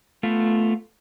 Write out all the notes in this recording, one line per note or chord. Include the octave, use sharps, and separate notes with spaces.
A3 B3 F4